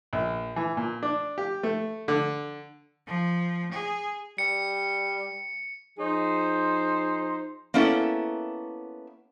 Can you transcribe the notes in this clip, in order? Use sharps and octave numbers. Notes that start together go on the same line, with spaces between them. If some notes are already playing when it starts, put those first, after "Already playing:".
A#1
E3
A#2
D4
G4
A3
D3
F3
G#4
G3 C#7
F3 D#4 G#4 C5
A#3 B3 C#4 E4 A4